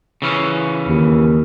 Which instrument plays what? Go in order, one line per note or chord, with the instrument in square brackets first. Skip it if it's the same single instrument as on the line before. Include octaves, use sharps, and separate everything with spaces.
[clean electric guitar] C#3 E3 C#4
[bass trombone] D#2